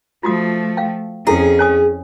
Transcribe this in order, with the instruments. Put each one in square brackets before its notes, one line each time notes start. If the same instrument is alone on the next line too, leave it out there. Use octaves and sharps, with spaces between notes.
[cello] F3 A3 [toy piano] F4 F#4 D#6
[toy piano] F5 G5
[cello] F2 C#4 [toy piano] E4 A4 [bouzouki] G#4
[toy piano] C#5 G#5 D#6